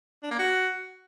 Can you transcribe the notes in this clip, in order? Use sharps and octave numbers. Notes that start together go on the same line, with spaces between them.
D4
A#3
F#4